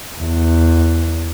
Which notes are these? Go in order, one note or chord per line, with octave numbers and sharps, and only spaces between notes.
E2